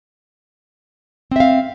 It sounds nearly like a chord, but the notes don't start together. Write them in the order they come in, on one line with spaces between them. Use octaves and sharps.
C4 E5 F5